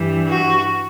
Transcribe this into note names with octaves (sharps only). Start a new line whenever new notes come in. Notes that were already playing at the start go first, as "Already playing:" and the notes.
Already playing: G2 E3 G3
F#4